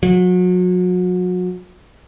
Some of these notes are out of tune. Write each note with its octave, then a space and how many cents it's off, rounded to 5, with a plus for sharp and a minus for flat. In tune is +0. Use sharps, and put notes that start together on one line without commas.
F#3 -35